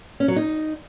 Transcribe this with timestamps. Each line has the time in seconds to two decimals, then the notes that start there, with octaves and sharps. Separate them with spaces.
0.20 C#4
0.28 F#3
0.36 D#4